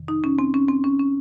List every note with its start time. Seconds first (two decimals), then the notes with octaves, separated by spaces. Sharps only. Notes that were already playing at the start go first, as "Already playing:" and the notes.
Already playing: F2 C3 D#3
0.08 D#4
0.24 C#4
0.39 C4
0.54 C#4
0.69 C4
0.84 C#4
1.00 C#4